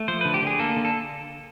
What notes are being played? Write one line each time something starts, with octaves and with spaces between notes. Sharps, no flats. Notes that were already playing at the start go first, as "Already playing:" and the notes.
Already playing: A3
F3 C5
D3 B4
G4
D3 G#4
A#3 A4
D3
A4